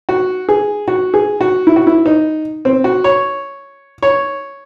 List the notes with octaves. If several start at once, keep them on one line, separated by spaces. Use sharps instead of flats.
F#4
G#4
F#4
G#4
F#4
E4
F#4
E4
D#4
C4
F#4
C#5
C#5